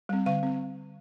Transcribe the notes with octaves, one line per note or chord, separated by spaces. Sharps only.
G3 C4
D3 F5
C4